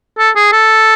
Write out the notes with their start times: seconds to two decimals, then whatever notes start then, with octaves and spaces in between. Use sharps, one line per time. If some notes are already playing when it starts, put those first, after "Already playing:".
0.18 A4
0.36 G#4
0.52 A4